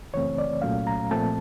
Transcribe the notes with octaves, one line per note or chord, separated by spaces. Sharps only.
F#2 C#3 E3 A3 C4 C#5
D5
C2 A#2 F#3 A3 C#4 F5
A#5
A#2 F3 A3 C4 A5